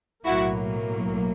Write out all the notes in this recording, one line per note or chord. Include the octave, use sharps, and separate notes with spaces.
B1 A2 F#3 A#3 E4 F#4